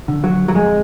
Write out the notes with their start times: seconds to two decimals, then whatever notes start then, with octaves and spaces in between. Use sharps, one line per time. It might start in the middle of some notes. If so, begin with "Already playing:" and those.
0.08 D3
0.24 F#3
0.48 F#3
0.55 F2 G#3